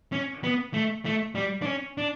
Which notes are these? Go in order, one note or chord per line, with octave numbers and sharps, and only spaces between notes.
C#4
B3
A3
A3
G3
D4
C#4
D4